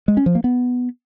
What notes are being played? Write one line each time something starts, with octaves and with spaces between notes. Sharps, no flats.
G#3
C#4
F3
A#3
B3